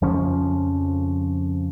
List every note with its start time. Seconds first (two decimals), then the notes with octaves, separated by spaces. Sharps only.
0.01 F2 C#3 F3 C#4